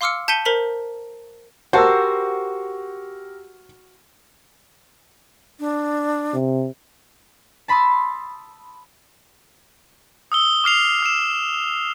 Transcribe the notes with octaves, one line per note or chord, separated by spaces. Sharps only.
F5 C6 D6 E6 F6 C#7
A5 G6 B6 C#7 D#7 G7
A#4 C5 A#5 B6 F7 F#7
F#4 G4 A#4 C5 F#5 A5 E6
D4
C3
A5 B5 C6 D#6 E6
D#6 E6 G7
D6 F6 C7 F7
E6 E7